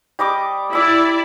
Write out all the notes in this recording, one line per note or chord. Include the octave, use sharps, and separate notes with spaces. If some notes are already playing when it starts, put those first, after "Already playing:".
G3 D#5 D6
E4 D5 E5 E6